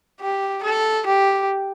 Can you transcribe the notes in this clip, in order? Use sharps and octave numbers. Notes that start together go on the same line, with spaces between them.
G4
A4
G4